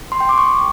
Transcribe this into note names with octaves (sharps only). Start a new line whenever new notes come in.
C6
G5
D6
C#6